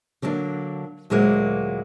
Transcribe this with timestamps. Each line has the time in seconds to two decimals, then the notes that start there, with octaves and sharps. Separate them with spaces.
0.22 D3 F#3 A#3 C#4 D4
1.10 D2 A#2 F#3 G#3 A#3 F#4